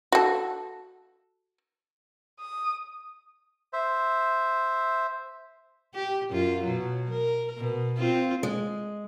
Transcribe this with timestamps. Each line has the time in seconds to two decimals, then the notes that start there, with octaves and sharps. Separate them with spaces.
0.12 F#4 A4
2.40 D#6
3.73 C5 E5
5.94 G4
6.31 F#2 F4
6.63 B2 F#3
7.10 A#4
7.57 B2
7.97 C4 F4
8.43 G#3